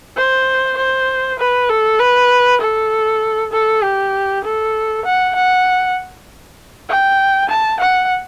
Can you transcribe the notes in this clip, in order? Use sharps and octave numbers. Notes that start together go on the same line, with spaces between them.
C5
C5
B4
A4
B4
A4
A4
G4
A4
F#5
F#5
G5
A5
F#5